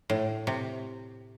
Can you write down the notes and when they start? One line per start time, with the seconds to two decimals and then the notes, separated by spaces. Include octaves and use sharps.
0.10 A2
0.47 C3